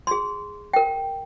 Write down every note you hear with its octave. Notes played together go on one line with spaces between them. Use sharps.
G#4 C6
A#4 G5